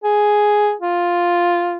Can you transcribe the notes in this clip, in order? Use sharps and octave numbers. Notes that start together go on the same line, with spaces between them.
G#4
F4